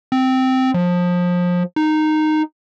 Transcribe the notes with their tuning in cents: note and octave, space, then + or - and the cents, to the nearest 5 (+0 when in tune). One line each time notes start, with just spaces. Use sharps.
C4 -10
F3 +25
D#4 -10